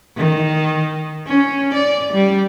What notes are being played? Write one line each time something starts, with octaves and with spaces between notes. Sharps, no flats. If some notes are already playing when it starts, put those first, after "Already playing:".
D#3
C#4
D5
G3